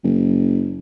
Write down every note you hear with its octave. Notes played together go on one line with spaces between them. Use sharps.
F#1